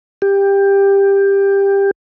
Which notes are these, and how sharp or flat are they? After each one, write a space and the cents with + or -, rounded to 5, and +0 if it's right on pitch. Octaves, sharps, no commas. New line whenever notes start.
G4 +15